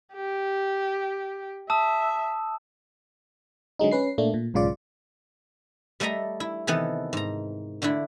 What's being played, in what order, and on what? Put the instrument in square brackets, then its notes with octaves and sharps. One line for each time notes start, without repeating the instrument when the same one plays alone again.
[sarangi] G4
[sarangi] E5 [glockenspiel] A5 D#6 E6
[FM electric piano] D3 F#3 G#3 D#4
C#4 B4 C7
A#2 A3 A#3 D4
A#2
B1 G#2 C#3 F4 D5
[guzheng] G3 A3 A4 D#5 E5 A#5
E4
C3 D#3 E3 B3 E4 A4
G#2 A#5
D3 A3 D4 E4